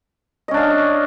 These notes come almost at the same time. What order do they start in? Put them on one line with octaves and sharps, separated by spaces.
D#5 C#4 D4 F5